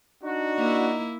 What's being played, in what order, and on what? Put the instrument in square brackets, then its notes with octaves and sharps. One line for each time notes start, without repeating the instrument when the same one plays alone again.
[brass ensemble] D4 F#4 [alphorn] D#4
[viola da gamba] A#3 E4